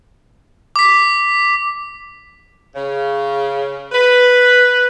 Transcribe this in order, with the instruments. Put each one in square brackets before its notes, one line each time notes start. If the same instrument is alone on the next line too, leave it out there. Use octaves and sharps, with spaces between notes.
[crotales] D6 B6
[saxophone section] C#3
B4